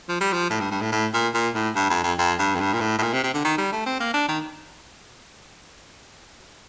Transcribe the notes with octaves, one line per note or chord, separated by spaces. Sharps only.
F3
G3
F3
A2
G2
G2
A2
A2
A#2
A#2
A2
G2
F2
F2
F2
G2
F2
G2
A#2
A2
A2
A#2
C3
C3
D3
D#3
G3
A3
C4
A#3
D4
D#3